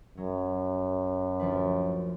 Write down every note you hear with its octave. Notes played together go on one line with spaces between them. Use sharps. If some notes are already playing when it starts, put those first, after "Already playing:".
F#2 F#3
D2 F3 B4